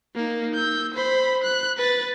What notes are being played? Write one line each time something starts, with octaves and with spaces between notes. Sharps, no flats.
A#3 D#4
E6 G6
C5 B5
F#6
B4 A6